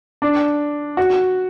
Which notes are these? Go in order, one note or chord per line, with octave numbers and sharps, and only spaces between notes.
D4
F#4